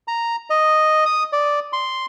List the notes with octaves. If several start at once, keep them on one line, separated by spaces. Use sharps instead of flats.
A#5
D#5
D#6
D5
C6